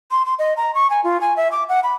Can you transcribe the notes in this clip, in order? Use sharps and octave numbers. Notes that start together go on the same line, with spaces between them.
C6
C6
D#5
A#5
C#6
G#5
F4
G#5
E5
D6
F#5
B5